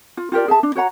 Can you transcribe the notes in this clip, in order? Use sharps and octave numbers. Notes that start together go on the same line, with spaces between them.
F4
F4 G4 A#4 D5
G#4 E5 A5
D4
F#4 C#5 F#5 A#5